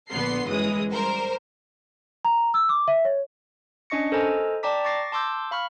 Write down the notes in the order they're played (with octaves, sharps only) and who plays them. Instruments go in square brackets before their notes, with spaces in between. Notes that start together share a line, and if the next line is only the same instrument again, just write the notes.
[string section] A#1 D3 B3 C6 C7
G1 F#2 E3 G#3 D#6
G3 A#4 C5
[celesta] A#5
E6
D6
E5
C#5
[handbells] C#4 D4 D#5 C#6 A#6 C#7
A4 A#4 C5 D#5 G#5 A#5
D5 G5 A5 A#5 D6 B6
C#6 D6 A6 A#6 C7
A5 C6 D6 E6 G6
F5 B5 C#6 F6